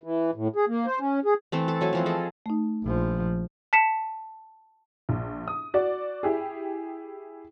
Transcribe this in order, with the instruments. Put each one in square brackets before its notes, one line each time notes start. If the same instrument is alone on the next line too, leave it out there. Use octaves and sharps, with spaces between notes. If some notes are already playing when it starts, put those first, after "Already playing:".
[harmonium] E3
A2
G#4
A#3
C5
C#4
G#4
[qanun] E3 A3 C4
A4
F#3 A3 G#5
E3 F3 C4
G#4 A4 D#5
[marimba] A3 D#4
[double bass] A#1 F3
[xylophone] A5 B6 C#7 E7
[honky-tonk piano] A#1
D#6
F#4 D5
E4 G4 G#4